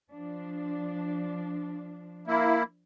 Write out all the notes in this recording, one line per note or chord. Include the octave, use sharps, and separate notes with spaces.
F3 D4
A#3 E4